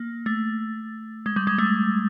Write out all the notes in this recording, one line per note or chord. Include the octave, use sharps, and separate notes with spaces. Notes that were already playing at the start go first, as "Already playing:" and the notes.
Already playing: A#3
A3
G#3
G3
G#3
A3